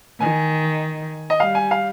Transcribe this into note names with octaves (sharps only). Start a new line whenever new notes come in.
D#3 G#5
D#5
G3 F5
G#5
F5